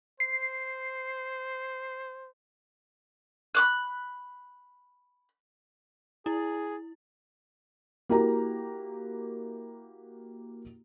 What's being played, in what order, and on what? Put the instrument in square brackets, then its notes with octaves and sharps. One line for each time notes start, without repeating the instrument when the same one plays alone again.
[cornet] C5 [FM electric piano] C7
[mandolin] B5 D6 F#6
[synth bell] E4 [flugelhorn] G#4
[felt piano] A#3 E4 F#4 G4 A#4 A#5